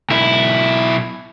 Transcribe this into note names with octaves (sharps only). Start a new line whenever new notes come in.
B1 E4